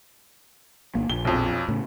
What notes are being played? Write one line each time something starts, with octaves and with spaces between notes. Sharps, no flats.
G1 A#3
A#1 G7
B1 F2
A2 C#3